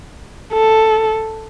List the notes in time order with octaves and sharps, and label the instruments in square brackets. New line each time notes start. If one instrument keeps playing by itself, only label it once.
[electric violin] A4